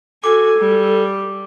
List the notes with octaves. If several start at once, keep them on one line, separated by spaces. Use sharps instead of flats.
F#4 A4 G#5 D6
G3